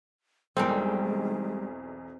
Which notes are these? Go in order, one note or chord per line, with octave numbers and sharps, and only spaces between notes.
B1 E2 G3 G#3 C4 D#4 A#4